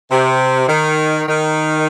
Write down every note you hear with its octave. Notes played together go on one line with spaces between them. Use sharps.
C3
D#3
D#3